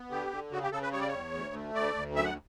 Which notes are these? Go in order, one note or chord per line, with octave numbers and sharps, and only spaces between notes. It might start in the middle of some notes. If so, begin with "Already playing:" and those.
Already playing: B3
D3 G4
D3
C#3 F#4
G4
C#3 A4
B4
G3 C#5
D5
C#5
E2
D2
A3
D2 D5
D2
F#2 E5
F#5